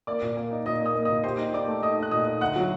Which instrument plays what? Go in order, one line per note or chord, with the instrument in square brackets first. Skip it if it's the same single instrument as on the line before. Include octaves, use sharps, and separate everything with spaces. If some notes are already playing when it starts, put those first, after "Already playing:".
[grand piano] A#3 [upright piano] D5 D6
[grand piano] A#2
A#3
D#4
[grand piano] A#2 [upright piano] D#5 D#6
[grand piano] A#3 [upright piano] D#5 D#6
[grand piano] A#3
[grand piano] A#2 [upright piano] D#5 D#6
[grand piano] G4 [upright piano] C5 C6
[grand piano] D#4
[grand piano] D#4 [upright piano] D5 D6
[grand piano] A3
[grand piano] D#4 [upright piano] D#5 D#6
[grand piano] D#4 [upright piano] F#6
[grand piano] A#2 [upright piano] D#5 D#6
[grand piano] D#4
[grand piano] D2 [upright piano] F#5 F#6
[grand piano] F#3